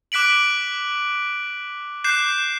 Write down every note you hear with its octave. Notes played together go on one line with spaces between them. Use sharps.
D6 F#6 B6 D7 F#7
D6 F#6 G6 C7 E7